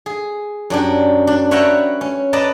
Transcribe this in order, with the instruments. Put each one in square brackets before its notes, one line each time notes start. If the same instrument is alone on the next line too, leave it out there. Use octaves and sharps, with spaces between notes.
[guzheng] G#4
F#2 D4 G4
D4
B4 C#5 E5 F#5 G5 A#5
C#4
B4 D5 D#5 A5 A#5